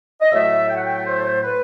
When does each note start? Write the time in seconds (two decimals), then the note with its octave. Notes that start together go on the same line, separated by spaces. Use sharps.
0.22 D#5
0.31 A2 F#3 A3 E5
0.69 G5
0.76 F#5
0.85 G5
1.06 C5
1.44 B4